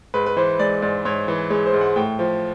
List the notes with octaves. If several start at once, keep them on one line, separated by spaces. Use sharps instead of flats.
G#2 B4
B4
E3 C5
G#3 D5
G#2 D5
G#2 C#5
E3
G#3 C#5
C5
G#2
F#5
A2 G5
F3